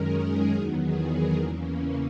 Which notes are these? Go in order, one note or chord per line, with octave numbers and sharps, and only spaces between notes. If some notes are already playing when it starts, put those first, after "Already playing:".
Already playing: F#2 D#3 G#3 C#4 A#4
G#4
E2 D#3 F#3 B3 G#4
G#4
A#4
E2 C#3 E3 A#3 C#4